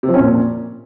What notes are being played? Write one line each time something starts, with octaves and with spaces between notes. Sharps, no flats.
C3
F3
C#4
A#2